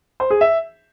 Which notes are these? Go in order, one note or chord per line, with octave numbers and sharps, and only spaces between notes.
C5
G#4
E5